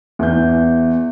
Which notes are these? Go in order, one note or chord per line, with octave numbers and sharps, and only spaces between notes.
E2 G6